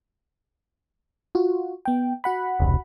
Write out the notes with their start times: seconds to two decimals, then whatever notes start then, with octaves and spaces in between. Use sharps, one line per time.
1.35 F4 F#4
1.85 B3 G5
2.24 F#4 F#5 B5
2.60 E1 C2